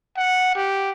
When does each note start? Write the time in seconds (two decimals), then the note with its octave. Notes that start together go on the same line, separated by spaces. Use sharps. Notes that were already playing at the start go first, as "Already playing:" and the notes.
0.17 F#5
0.55 G4